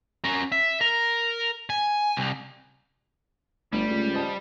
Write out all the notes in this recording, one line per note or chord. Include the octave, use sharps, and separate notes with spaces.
C#4 A#4
E5
A#4
G#5
C2
G1 G3 A3
C#2
C5 D#5 A5